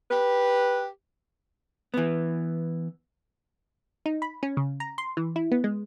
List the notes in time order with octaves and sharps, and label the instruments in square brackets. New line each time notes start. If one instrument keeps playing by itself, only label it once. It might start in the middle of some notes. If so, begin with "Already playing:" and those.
[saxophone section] G4 B4
[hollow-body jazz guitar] E3 B3
[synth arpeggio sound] D#4
B5
C#4
C#3
A#5
C6
E3
E4
B3
G#3